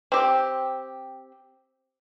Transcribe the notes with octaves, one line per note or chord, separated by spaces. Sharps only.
C4 G4